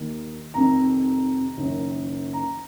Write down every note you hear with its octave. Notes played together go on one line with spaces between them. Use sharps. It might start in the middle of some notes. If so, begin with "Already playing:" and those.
Already playing: D#2 D#3 A#3
F1 F2 D#3 A#5
F#1 F#2 D#3
A#5